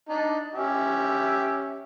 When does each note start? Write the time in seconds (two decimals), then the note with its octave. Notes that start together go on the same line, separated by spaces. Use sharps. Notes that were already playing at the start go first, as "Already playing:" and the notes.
0.09 D4 D#4
0.55 C#4 G4 E5